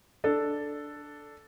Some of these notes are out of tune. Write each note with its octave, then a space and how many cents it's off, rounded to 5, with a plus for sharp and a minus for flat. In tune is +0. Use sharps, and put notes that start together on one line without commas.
D4 +0 A4 +0